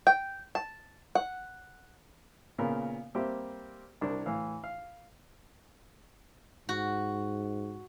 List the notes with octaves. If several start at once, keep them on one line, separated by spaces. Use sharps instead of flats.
G5
A5
F#5
A#2 C#3 B3 A#4
G3 A#3 C4 G4 E5
C2 D4 A#4
A2 E3 F5
F5
G#2 F#4